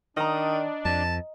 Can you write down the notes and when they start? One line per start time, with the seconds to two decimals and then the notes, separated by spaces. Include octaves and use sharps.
0.17 D#3 D4 D#5 A#5
0.85 F2 A5